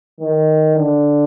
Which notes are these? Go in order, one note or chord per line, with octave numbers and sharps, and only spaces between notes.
D#3
D3